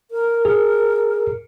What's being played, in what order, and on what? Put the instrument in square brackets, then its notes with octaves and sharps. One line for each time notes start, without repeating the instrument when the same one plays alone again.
[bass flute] A#4
[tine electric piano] G#4